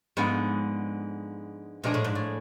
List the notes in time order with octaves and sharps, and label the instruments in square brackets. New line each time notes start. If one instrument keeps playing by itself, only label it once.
[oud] G#2 [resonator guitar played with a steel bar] D3 F3 G#3 B3
[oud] B2 [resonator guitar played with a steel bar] F3 G#3 D4 G#4
[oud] A2
G#2
A2